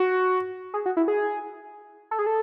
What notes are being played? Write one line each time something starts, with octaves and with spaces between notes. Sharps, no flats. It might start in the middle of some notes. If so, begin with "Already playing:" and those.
Already playing: F#4
G#4
F#4
E4
G#4
A4
G#4
A4